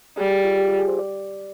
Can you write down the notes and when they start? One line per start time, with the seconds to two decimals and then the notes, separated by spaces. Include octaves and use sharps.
0.17 G3 G#4
0.30 G4
0.44 F4
0.58 G4
0.68 F4
0.79 G#4
0.88 C5
0.99 D5